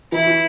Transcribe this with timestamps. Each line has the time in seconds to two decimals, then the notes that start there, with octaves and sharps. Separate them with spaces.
0.12 E3 E4
0.27 E3